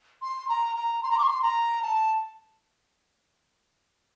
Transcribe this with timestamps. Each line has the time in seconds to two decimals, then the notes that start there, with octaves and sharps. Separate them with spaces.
0.22 C6
0.48 A#5
0.75 A#5
1.03 C6
1.10 A#5
1.18 D6
1.22 C6
1.42 A#5
1.82 A5